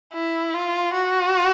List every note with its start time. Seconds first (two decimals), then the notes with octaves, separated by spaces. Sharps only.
0.13 E4
0.54 F4
0.94 F#4